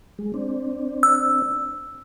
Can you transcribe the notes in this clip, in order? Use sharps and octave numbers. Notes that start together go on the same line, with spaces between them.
G#3
C4 D4
E6